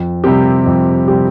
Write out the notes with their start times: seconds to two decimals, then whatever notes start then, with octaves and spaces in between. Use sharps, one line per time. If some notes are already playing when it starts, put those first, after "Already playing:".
Already playing: F2
0.24 C3 G3 C4 G4
0.66 F2
1.08 C3 G3 C4 G4